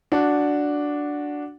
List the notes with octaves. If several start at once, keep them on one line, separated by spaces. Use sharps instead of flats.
D4 F#4